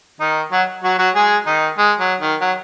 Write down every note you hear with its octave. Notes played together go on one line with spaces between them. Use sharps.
D#3 D#4
F#3 F#4
F#3 F#4
F#3 F#4
G#3 G#4
D#3 D#4
G#3
F#3
D#3
F#3